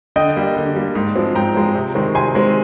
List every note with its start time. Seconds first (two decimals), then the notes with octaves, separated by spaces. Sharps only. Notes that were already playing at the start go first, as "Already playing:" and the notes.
0.16 D3 D#5 G5
0.36 G3 A#3
0.56 D3
0.76 G3 A#3
0.95 G#2
1.16 F3 G#3 C4
1.35 G#2 G5 A#5
1.55 F3 G#3 C4
1.75 C3
1.95 D#3 G#3 C4
2.15 C3 G#5 C6
2.35 D#3 G#3 C4